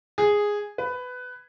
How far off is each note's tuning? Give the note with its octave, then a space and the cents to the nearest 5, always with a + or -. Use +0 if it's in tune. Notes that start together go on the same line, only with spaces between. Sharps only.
G#4 -5
B4 +15